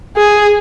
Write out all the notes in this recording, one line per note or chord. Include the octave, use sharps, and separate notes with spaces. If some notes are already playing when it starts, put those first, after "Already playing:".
G#4